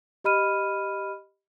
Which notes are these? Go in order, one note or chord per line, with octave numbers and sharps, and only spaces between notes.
G4 D#5 B5 F6 D#7